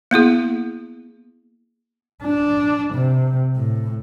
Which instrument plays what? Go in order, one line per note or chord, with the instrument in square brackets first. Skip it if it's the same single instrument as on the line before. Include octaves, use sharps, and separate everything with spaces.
[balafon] A#3 B3 E4 G#4
[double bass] D4
C3
A2